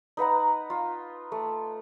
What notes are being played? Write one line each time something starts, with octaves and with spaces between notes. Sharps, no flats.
D#4 B4 F#5 A#5
F4
A3